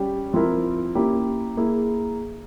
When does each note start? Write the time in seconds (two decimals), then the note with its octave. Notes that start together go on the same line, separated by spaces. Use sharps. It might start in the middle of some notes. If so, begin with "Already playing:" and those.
Already playing: G3 C#4 G4
0.34 F3 C4 E4 A#4
0.95 A#3 C#4 E4 G4
1.57 A#3 E4 G#4